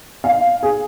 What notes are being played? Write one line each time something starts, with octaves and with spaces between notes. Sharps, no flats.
F5
G#4